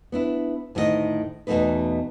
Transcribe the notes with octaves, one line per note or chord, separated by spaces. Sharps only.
B3 D4 E4
D2 A2 D#3 F#4 D#5
E2 B2 F#3 A3 D#4 B4